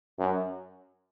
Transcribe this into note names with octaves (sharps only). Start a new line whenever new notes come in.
F#2